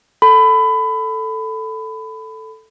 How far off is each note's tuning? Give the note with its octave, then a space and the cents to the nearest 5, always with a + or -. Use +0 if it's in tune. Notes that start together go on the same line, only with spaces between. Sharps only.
A4 +0 B5 +25